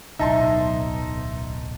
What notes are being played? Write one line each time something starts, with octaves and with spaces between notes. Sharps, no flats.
D1 B1 D#4 E5 A5 C6